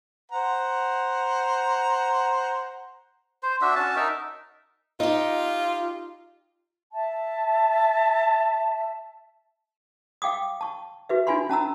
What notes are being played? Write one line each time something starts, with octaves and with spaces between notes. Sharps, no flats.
C5 F#5 A#5
C5
D4 F#4 E5
C#4 F#4 A5
D#4 A#4 E5
D#4 F4 G4
E5 A5
F5 G5 D6 D#6
A5 C#6
F#4 B4 E5
D4 D#4 F4 G#5 B5 C6
C#4 A5 A#5 E6